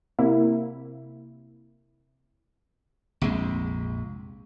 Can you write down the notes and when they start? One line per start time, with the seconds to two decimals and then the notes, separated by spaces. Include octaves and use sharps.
0.19 C3 A#3 E4
3.22 A#1 F2 C3 G#3